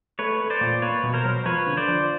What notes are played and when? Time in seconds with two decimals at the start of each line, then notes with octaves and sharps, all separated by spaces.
0.19 A3 B4 C#5
0.40 A3
0.50 C5 D5
0.61 A#2
0.82 A#3 B4 C#5
1.03 B2
1.14 A#4 C5
1.24 F#3
1.45 F3 B4 C#5
1.66 D3
1.77 C5 D5
1.88 F3